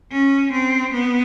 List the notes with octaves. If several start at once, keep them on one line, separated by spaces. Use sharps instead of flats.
C#4
C4
B3